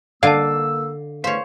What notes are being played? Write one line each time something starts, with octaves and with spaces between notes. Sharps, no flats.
D3 A#3 D5 F5 A5 E6
E2 A3 C#4 C5 C#5 F5